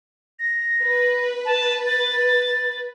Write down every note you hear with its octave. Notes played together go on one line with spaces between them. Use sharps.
A#6
B4
A5
A6